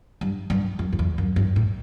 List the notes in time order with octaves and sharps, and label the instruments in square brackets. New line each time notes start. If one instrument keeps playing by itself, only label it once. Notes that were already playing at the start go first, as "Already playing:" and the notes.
[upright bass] G2
G2
F#2
F#2
E2
F#2
G2
A2